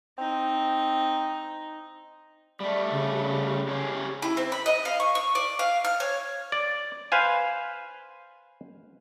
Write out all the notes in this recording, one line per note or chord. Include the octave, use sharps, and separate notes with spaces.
C4 D#4
G3 A3 D5
C#3
C#4 G4 G#4
E4
C4
B5
D#5
F5
C#6
C#6
D5
F5
F6
C#5
D5
B4 C5 F5 G#5